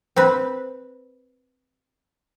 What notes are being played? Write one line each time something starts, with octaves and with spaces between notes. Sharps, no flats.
C4 B4